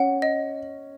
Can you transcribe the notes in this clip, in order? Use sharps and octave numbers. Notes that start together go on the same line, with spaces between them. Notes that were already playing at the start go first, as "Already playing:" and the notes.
Already playing: C#4 F#5
D#5